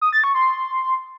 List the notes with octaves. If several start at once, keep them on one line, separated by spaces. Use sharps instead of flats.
D#6
A6
C#6
C6